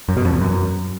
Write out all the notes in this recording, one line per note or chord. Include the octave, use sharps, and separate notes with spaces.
F#2
B2
F2
E2
F#2